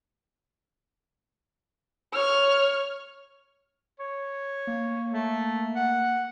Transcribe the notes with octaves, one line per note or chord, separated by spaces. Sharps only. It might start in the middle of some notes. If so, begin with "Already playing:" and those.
C#5 F6
C#5
A#3
A3
F#5